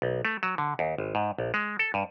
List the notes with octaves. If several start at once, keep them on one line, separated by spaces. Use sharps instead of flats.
B1
A3
F#3
D3
D#2
G#1
G#2
A#1
G#3
A4
G2